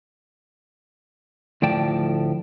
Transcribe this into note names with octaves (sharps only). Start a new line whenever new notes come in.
D2 A2 F3 D5 G5 A5